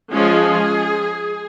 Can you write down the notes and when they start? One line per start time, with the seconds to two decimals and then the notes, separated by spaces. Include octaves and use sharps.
0.12 F3 G#3 C#4 G#4